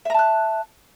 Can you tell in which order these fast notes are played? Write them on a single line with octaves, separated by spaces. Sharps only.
E5 A#5 A5 F#6